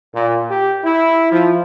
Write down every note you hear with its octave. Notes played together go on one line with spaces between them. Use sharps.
A#2
G4
E4
F3